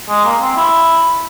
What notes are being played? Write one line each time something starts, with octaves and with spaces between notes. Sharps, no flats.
G#3
A#3
C4
E4